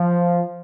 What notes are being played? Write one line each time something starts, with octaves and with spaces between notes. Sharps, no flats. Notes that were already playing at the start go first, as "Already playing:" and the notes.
Already playing: F3